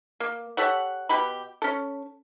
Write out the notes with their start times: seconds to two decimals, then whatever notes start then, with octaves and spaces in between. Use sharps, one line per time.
0.20 A#3
0.57 G4 A4 C#5 F#5
1.09 B2 G4 B5
1.62 C#4 A4